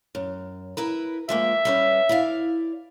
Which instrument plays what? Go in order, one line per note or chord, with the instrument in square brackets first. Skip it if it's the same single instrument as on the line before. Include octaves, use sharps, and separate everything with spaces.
[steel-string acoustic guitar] F#2
E4 A#4 B4
[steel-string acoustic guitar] F3 G#3 A#3 [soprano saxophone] E5
[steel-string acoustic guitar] G3 C#4 B4
E4 D5 F5